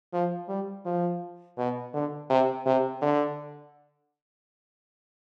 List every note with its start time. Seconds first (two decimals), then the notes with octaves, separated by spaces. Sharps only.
0.13 F3
0.49 G3
0.86 F3
1.58 B2
1.94 D3
2.30 C3
2.66 C3
3.02 D3